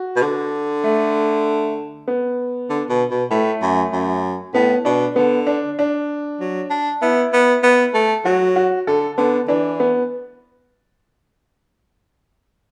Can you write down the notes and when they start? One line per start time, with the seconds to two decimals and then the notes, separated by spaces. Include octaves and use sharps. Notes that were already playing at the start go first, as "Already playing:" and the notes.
Already playing: F#4
0.16 B2
0.22 D3
0.84 A3
2.08 B3
2.69 D3
2.89 B2
3.10 B2
3.30 A2 A3
3.62 F#2
3.93 F#2
4.54 A2 B3
4.85 B2 D4
5.16 D3 B3
5.47 D4
5.79 D4
6.40 F#3
6.70 D4
7.02 B3 E4
7.33 B3
7.63 B3
7.94 A3
8.25 F#3 F#4
8.56 F#4
8.87 D3 A4
9.18 D3 B3
9.48 E3 D4
9.80 B3